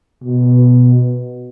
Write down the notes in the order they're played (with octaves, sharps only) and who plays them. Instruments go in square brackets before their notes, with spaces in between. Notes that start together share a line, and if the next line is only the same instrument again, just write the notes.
[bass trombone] B2